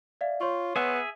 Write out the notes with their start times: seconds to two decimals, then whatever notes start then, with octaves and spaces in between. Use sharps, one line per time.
0.21 D5 E5 F5
0.41 F4 C#5 C6 C#6
0.76 B3 G#4 E5